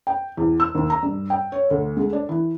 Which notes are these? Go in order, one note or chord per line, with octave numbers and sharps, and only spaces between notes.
G5
E2
E6
D#2
A#5
G2
G5
C#5
D2
G#3
D4
E3